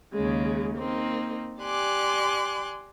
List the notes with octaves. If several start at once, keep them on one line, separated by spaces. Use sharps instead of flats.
D#2 C#3 G#3
A#3 C4 D#4
G4 D5 G#5 C6 D6 F#6